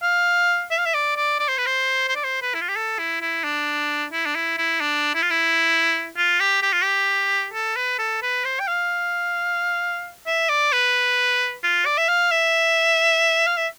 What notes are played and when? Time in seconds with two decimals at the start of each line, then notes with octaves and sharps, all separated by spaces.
0.03 F5
0.71 E5
0.78 F5
0.86 E5
0.94 D5
1.17 D5
1.39 D5
1.48 C5
1.57 B4
1.66 C5
2.08 C5
2.16 D5
2.24 C5
2.42 B4
2.54 E4
2.61 F4
2.69 G4
2.76 A4
2.99 E4
3.21 E4
3.44 D4
4.12 E4
4.26 D4
4.36 E4
4.58 E4
4.81 D4
5.14 E4
5.22 F4
5.30 E4
6.17 F4
6.40 G4
6.62 G4
6.73 F4
6.82 G4
7.53 A4
7.76 B4
7.99 A4
8.22 B4
8.45 C5
8.60 G5
8.67 F5
10.26 E5
10.49 D5
10.72 B4
11.63 F4
11.86 D5
11.98 E5
12.08 F5
12.31 E5
13.47 F5
13.57 E5